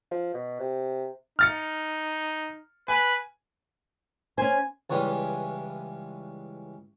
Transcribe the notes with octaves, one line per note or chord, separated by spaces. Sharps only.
F3
B2
C3
D#4 F6 A6 C#7
B4 G#5
C#4 C5 G#5
C#2 C#3 E3 G3 G#3